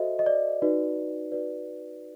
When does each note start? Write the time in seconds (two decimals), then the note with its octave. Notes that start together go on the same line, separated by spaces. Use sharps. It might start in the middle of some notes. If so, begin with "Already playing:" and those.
Already playing: F#4 A4 C5 D#5 E5
0.19 D#5
0.26 D5
0.62 D#4 F#4 B4 D5
1.32 D#4 F#4 B4 D5